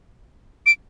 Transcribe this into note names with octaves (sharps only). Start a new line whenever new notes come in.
D7